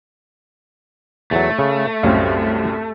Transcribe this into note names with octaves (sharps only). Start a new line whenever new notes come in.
E2 F#3 A3
C#3
C2 F#2 A2 C4 C#5 F5